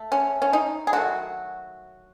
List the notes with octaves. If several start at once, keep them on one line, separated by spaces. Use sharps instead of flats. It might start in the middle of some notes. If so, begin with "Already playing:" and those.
Already playing: A3
C#4
C#4
D#4
G#4
D#3 F#3 A3 F#4